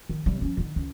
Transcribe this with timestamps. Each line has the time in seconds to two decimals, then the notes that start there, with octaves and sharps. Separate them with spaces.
0.09 D#3
0.26 C3 G3
0.41 F3 C#4
0.57 D3 D#3
0.76 C#2